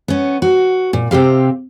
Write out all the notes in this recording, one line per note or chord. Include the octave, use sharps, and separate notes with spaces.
B3 C#4
F#4
A#2
C3 C4 G4 F5